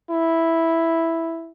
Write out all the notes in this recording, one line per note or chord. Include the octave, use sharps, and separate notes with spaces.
E4